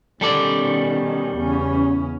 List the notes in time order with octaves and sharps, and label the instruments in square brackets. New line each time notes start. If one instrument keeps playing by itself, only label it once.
[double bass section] B2 D#3 C#4 [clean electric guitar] G3 A4 D5
[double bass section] E2 C#3 C#4